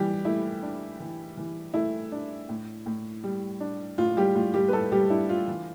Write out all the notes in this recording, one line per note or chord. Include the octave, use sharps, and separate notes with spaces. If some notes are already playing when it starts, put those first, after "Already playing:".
Already playing: E3 G3 G4
A3 E4
D4
E3
E3
A3 E4
D4
A2
A2
G3
D4
A2 F4
G3 G4
A2 F4
G3 G4
B4
G3 A3 A4
G3 G4
D4 E4
F4
E3